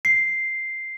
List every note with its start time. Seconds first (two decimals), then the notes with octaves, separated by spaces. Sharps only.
0.05 C7